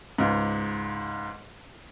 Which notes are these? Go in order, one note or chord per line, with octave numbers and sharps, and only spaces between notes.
C#2 G#2